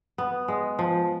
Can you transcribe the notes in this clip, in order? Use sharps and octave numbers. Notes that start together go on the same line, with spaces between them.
B3
G#3
F3